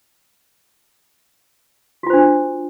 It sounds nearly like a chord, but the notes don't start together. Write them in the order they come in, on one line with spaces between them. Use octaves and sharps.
F#4 F4 C5 D4